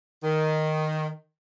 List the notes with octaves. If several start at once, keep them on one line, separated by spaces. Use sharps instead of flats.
D#3